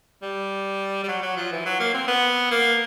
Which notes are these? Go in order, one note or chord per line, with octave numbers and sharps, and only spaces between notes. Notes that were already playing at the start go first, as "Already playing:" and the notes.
G3
G3
F#3
F#3
F3
E3
F#3
A#3
C4
B3
A#3